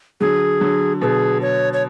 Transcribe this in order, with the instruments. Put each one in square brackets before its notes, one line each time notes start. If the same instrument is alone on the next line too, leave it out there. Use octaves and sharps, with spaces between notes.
[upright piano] D3 F#3 [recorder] G#4
[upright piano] D3 F#3
[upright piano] B2 D3 [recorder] G#4 A4
[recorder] C#5
C#5